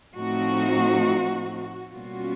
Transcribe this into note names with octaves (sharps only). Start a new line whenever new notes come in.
A2 F3 A3 C4 D#4 F#4
B2 G3 A#3 C#4 F4 F#4